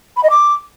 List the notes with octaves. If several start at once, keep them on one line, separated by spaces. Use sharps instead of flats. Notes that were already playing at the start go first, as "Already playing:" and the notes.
B5
D#5
D6